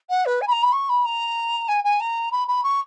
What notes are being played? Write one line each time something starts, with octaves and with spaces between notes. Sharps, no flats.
F#5
B4
G#5
B5
A#5
B5
C#6
B5
A#5
G#5
G#5
A#5
B5
B5
C#6